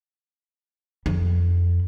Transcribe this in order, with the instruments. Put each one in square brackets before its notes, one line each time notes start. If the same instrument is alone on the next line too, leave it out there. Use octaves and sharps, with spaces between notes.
[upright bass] F2